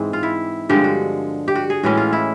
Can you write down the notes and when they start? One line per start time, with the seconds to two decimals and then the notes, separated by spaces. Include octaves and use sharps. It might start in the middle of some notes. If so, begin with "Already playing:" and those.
Already playing: G#2 E3 G#3 C4
0.13 F4
0.23 E4
0.69 G2 D3 F3 G#3 G4
0.84 F#4
1.48 G4
1.55 F#4
1.70 G#4
1.83 A2 E3 G#3 C#4 F#4
1.97 F4
2.13 E4